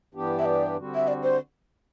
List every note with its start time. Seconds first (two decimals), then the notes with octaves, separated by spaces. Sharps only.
0.15 G2 E3 B3 D4 G4
0.39 E5
0.46 D5
0.77 D3 G3 C4 F#4
0.95 E5
1.08 D5
1.23 C5